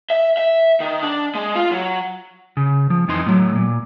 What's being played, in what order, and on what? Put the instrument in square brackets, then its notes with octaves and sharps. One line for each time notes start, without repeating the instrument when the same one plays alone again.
[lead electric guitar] E5
E5
D#3
D4
G#3
F4
F#3
[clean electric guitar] C#3
F3
F2 E3 D#4 C6
A2 F#3
A#2